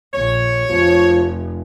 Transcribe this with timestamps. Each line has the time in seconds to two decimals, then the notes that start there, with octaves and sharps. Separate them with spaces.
0.13 A#1 C#5
0.70 F1 F3